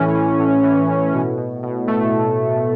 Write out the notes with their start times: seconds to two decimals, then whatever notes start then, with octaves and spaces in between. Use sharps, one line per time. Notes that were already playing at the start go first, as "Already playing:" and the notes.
Already playing: A2 E3 C#4
0.15 E3
0.40 A2
0.63 E3
0.88 A2
1.14 B2
1.38 B2
1.63 B2
1.88 B2 A3